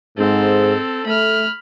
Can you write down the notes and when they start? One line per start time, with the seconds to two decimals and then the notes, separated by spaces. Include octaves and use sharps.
0.18 G#2 C4 A4
1.06 A3 B5 F6